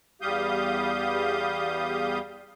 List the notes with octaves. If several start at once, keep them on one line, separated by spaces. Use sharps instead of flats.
E2 G3 G4 F5 D#6 G6